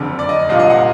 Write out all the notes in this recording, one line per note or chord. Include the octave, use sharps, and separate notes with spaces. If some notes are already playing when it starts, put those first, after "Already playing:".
Already playing: F#1 F2 D3
D5
D#5
D5
C2 A#2 F3 A#3 D#5
D#5
F#5